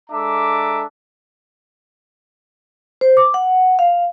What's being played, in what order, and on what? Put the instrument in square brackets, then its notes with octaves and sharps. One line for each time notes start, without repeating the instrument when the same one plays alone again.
[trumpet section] G#3 D4 A4 E5 A#5 D6
[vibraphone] C5
D6
F#5
F5